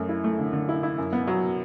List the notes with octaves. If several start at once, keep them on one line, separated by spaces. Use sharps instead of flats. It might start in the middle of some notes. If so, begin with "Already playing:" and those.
Already playing: F#2 A3
E4
A3
D3
D3
E4
E4
F#2
B3
F#3